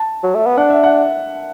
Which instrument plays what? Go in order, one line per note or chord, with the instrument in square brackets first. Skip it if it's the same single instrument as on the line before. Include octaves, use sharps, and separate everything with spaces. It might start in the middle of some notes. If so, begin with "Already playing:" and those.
Already playing: [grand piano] A5
[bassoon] F#3
A3
B3
[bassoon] D4 [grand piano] F#5
[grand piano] E5
F#5